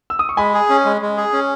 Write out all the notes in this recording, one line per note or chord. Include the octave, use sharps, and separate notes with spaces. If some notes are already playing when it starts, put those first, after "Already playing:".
E6
D#6
C#6
G#3 G#5 B5
G#4
C#4
G#3
G#3
G#4
C#4